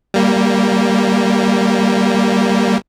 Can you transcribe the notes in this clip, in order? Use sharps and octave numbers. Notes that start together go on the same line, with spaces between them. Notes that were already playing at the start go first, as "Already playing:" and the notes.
G3 A#3